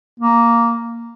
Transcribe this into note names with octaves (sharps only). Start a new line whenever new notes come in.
A#3